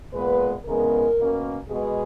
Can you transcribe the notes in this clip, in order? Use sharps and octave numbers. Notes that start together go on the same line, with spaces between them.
A#2 G#3 B3 B4
E2 C#3 G#3 B3 A#4
B2 A#3 C#4
B2 G#3 B3 G#4